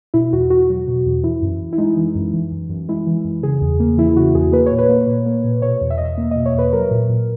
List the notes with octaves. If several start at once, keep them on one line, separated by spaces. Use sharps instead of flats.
B2 E4
E2 F#4
E2 F#4
F#3
B2
E2
E3 E4
F#2
F#2
E4
G#3 D#4
E3
F#2
E3
F#2
F#2
G#3 E4
E3
F#2
C#3 G#4
E2
A#3
E3 E4
C#3 F#4
E2 G#4
A#3 B4
C#5
A#2
B4
A#3
A#2
A#3
A#2
B2 C#5
E2
E5
E2 D#5
E5
A#3
D#5
B2
C#5
E2 B4
F#3 A#4
A#2
A#2